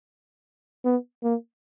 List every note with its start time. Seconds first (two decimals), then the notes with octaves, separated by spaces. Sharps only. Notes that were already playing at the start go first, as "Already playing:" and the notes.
0.85 B3
1.23 A#3